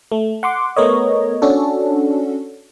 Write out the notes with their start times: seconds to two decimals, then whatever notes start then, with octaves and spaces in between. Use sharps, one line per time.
0.12 A3
0.43 F#5 C6 D6
0.76 A3 B3 A#4 C#5 D#5
1.42 C#4 D4 F#4 A4